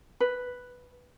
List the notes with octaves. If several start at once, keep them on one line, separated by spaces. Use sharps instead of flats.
B4